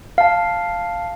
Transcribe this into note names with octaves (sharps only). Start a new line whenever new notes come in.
F5 A5